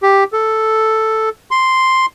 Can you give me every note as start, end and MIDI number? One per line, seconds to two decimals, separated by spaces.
0.03 0.24 67
0.33 1.29 69
1.51 2.06 84